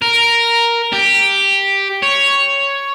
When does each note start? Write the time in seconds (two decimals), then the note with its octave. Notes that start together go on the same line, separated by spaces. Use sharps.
0.02 A#4
0.93 G4
2.03 C#5